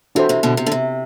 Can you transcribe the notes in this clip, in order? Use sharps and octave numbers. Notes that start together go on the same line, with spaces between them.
C3 E3 D4 F#4 A4 C5
C3 E3
B2 D3
C3
D3
C3